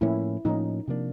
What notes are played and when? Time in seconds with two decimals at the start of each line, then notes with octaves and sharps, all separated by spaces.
0.01 A2 F3 A#3 C#4 E4
0.45 A2 F3 A#3 C#4 D#4
0.88 C3 F3 A#3 D4